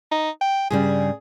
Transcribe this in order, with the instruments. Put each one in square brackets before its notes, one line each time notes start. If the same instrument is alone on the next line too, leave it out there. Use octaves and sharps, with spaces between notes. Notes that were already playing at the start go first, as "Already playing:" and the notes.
[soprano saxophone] D#4
G5
[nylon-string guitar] G2 C#3 G3 [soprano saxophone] G#4